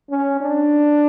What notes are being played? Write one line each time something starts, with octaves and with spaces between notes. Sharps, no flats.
C#4
D4